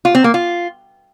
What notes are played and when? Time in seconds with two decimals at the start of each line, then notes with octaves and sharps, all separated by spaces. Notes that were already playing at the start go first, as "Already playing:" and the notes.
0.05 F4
0.15 C4
0.24 A#3
0.34 F4